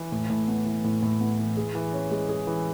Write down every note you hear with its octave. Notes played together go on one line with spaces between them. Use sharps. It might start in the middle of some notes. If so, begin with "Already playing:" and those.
Already playing: E3
A2
A2
B3
E3
A2
A2
B3
E3
G#4
E3
C#4
G#3
G#4
E3